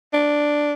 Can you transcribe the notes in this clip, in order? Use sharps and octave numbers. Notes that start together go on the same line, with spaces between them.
D4